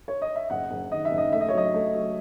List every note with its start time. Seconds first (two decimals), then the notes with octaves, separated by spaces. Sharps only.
0.08 C#5
0.22 D#5
0.36 E5
0.50 F#1 F#5
0.71 F#1
0.91 D#3 D#5
1.05 E5
1.11 F#1
1.18 D#5
1.32 A3 E5
1.41 D#5
1.49 C#5
1.53 F#3 D#5
1.74 A3
1.95 F#3